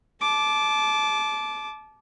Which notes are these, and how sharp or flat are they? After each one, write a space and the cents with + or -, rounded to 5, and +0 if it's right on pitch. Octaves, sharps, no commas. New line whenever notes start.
A5 -30 D6 +0